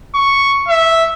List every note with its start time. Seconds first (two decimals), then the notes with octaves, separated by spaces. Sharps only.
0.15 C#6
0.68 E5